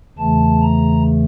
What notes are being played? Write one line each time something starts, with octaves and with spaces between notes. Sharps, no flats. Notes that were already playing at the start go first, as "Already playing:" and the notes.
E2 C#3 E3 A3 A5
A#5